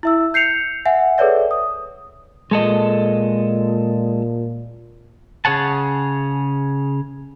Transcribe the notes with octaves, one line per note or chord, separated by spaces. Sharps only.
E4 E5 E6
G6 C7 C#7 F7
E5 F#5 G#5
G#4 A4 B4 C#5 D5 E5
D#6
A#2 G#3 A4 D#5
C#3 G#4 C#5 F#5 A5